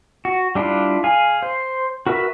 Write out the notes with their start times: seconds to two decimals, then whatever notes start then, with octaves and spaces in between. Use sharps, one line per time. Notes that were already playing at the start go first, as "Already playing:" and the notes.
0.25 F#4
0.55 G3 D4 E4 F4
1.04 G#4 F5 G#5
1.43 C5
2.07 F#4 A#4 B4 E5